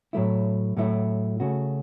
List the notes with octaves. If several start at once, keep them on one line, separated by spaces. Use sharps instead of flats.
A2 F#3 A3 E4
A2 F#3 A3 E4
C#3 A3 F#4